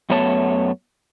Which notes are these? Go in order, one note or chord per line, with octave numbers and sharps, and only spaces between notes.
F#2 A3 B3 C#5 A5